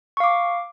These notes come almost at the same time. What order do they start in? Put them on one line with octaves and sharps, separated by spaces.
C#6 F5 D6